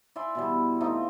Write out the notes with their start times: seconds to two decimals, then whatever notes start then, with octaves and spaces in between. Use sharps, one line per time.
0.16 D5 E5 G#5 C6
0.35 B2 E3 G3
0.81 A3 C4 D#4 F4